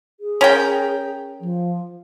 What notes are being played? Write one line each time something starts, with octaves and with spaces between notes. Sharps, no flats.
G#4
C#4 A#4 G5
F3